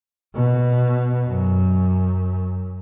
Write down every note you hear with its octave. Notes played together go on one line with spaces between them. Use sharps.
B2
F#2